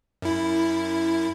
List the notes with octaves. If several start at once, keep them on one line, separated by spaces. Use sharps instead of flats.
F#2 E4